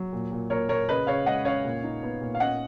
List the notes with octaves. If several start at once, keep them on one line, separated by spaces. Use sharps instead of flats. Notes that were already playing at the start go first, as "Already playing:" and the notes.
Already playing: F#3
A#2
A#2
A#2 A#4 C#5
A#2 A#4 C#5
C#3 B4 D#5
C#3 C#5 F5
G#3 D#5 F#5
C#4 C#5 F5
A#2
D#4
B3
A#2
F5
C#4 D#5 F#5